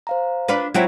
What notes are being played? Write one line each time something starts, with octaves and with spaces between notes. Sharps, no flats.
C5 F5 A#5
D4 F4 B4
F#3 C4 E4 F4 C#5